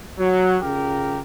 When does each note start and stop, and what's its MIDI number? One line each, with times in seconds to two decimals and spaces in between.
0.19 0.56 54
0.62 1.19 49
0.62 1.19 65
0.62 1.19 67
0.62 1.19 70